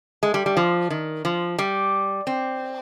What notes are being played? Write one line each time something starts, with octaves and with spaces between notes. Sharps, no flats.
G#3
G3
G3
F3
D#3
F3
G3
C4